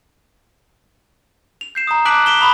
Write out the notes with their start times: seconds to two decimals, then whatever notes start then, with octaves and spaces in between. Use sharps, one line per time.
1.61 F7
1.75 G6 C7 E7
1.87 A#5 D#6
2.05 A5 D6 F#6 B6 D7 F#7
2.26 B6 D7 E7 G7
2.40 A#5 B5 D#6